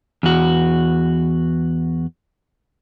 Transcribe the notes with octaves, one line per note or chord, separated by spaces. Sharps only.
E2 F#4